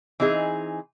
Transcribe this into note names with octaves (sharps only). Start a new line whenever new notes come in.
E3 C4 D#4 G#4